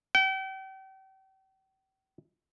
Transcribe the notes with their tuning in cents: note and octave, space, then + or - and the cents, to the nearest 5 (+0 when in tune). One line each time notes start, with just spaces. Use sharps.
G5 -40